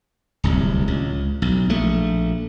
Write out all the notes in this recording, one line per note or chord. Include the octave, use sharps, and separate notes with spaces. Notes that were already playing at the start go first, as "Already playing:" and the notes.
D1 C2
C#2
B1
A#1 A3